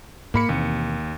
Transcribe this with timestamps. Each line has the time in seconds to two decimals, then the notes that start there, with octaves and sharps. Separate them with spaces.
0.34 G#2 A#3 B5 C#7
0.49 D#2 B2 E3 C4